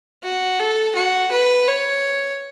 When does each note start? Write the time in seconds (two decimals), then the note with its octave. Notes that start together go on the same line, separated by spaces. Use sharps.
0.24 F#4
0.59 A4
0.96 F#4
1.32 B4
1.68 C#5